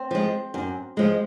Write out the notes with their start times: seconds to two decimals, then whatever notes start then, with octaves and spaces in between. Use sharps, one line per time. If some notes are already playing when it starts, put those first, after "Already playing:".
Already playing: C4 C5
0.11 F3 G#3
0.54 F#2
0.97 F3 G#3